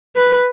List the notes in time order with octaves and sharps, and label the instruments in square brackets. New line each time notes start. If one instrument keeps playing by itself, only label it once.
[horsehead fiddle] B4